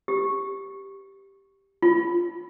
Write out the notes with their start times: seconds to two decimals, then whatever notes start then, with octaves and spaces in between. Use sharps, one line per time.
0.08 G4
1.82 F4